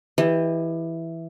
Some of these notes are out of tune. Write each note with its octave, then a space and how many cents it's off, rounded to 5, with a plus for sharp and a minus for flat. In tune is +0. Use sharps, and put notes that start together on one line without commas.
E3 +0 G4 +25 D#5 -5